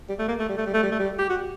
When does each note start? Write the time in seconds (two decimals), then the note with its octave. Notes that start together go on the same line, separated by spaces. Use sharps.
0.09 G3
0.19 A3
0.28 A#3
0.39 A3
0.49 G3
0.58 A3
0.66 G3
0.74 A3
0.83 G3
0.92 A3
0.99 G3
1.19 G4
1.30 F#4